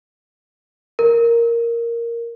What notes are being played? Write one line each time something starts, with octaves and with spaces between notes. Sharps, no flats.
A#4